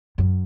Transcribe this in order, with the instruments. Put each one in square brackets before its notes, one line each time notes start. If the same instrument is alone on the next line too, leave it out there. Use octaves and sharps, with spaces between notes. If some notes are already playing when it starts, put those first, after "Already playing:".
[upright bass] F#2